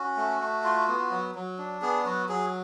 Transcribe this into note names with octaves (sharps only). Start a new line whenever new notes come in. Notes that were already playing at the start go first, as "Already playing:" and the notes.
Already playing: C#4 F#4
A3
A3
F4
B3
F#3
F#3
D4
B3 G#4
F#3 F#4
F#3 G#4